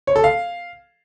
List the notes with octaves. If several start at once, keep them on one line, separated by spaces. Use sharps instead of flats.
C#5
A4
F5